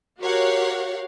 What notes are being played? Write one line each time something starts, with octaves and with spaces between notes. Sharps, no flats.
F#4 G4 A#4 C#5 F5 F#5